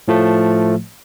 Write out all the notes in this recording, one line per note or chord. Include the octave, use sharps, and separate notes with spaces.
A2 F3 A3